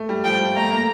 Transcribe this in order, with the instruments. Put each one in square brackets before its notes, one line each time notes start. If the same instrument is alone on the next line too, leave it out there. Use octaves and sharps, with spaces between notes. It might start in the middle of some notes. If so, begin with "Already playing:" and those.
Already playing: [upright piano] A3
G3
[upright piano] F3 [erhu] G5
[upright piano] G3
[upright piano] A3 [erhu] A#5
[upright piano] A#3